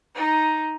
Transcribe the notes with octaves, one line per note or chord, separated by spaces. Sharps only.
D#4